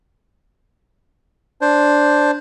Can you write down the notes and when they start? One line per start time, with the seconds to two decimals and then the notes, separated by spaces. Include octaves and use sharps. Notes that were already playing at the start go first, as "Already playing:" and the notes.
1.61 D4 C5